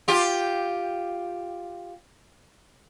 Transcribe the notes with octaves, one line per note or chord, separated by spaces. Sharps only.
F4 G4